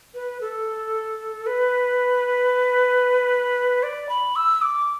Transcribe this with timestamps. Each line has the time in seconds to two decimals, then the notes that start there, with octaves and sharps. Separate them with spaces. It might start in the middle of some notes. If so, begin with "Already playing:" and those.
0.14 B4
0.41 A4
1.46 B4
3.83 D5
4.09 B5
4.36 E6
4.62 D6